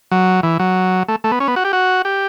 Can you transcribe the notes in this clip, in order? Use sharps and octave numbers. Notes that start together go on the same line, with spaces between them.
F#3
E3
F#3
A3
A3
B3
C#4
B3
F#4
G4
F#4
G4